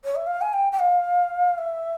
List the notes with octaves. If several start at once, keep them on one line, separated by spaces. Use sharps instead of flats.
C#5
E5
F5
G#5
G5
G5
F5
E5